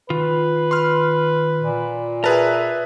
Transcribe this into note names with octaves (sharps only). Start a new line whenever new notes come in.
D#3 F4 B4
C6 F6
A#2
G#4 A#4 B4 E5 A5